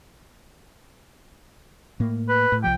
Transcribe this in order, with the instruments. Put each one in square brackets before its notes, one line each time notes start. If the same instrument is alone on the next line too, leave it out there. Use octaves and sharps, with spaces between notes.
[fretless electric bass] A2 A#3
[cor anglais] B4
[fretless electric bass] A2
[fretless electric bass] C2 F3 [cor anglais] G5